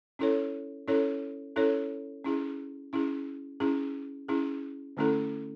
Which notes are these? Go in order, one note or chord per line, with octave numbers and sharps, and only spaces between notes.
C#4 E4 A4 C#5
C#4 E4 A4 C#5
C#4 E4 A4 C#5
C#4 E4 G#4
C#4 E4 G#4
C#4 E4 G#4
C#4 E4 G#4
D3 A3 C#4 E4 A4